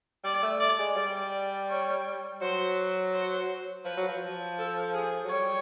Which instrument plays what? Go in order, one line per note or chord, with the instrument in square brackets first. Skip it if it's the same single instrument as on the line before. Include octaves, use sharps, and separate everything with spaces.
[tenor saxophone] G3 [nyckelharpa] D5
[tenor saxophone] A3
[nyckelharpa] D5
[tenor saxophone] G#3
[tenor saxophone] G3 [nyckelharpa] D5
[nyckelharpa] C#5
[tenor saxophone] F#3 [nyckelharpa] C5
[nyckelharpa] C5
[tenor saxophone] F3 [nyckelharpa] B4
[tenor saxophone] F#3
F3
[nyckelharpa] A4
G#4
[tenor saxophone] F#3
[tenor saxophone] G3 [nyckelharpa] C#5